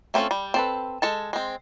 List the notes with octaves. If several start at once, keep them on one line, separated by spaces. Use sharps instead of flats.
A3 C4 C#4 F4 A4
G3
C4 A4 B4
G#3 A4 A5
G#3 C4